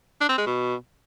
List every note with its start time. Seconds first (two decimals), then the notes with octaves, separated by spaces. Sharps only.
0.21 D4
0.29 C4
0.38 G#3
0.46 B2